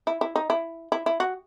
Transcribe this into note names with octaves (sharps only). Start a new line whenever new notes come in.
E4
E4
D#4
E4
E4
E4
F#4